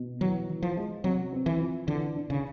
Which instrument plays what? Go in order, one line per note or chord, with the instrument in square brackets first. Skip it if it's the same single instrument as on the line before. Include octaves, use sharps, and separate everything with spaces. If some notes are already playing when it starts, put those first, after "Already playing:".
Already playing: [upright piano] B2
[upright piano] E3 [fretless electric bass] F#3
[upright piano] E3
[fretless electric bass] F3
[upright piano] G#3
[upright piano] C3 [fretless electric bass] F#3
[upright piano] C4
[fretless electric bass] E3
[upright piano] F3
[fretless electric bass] D3 [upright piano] E3
[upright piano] D4
[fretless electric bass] C#3